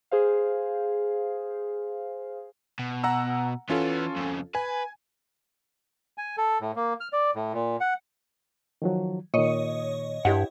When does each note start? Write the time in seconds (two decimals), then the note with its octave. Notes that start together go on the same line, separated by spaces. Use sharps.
0.11 G#4 C5 F5
2.79 B2
3.04 F#5 A#5 E6
3.70 E3 B3 C#4 F4 A4
4.16 F2 C#3
4.55 B4 G#5
6.18 G#5
6.38 A4
6.61 A2
6.76 A#3
7.00 F6
7.13 D5
7.35 A2
7.53 A#2
7.80 F#5
8.82 D#3 F3 F#3
9.34 A#2 D#3 C#5 D#5
10.25 G2 E4 G4 F#5